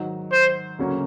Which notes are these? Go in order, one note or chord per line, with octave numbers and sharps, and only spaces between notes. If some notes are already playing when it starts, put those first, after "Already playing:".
Already playing: G#2 D#3 F#3
C5
D2 C#3 F#3 A#3 C#4